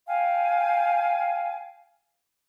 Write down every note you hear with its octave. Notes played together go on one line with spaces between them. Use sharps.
F5 G5 G#5